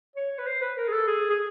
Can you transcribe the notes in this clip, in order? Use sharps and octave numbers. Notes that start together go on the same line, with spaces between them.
C#5
B4
C5
B4
A#4
G#4
A4
G#4
G#4